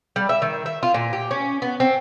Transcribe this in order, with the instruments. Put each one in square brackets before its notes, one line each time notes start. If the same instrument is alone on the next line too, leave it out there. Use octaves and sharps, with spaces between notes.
[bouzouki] G3
E5
D#3
E5
F4
A#2
G4
C#4
B3
C4